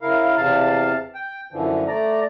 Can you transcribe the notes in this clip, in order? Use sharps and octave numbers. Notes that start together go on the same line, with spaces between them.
C#3 E4 A#4 F5
E2 C3 F5 A5
G5
F#2 D3 E3 F3
A3 D5 A#5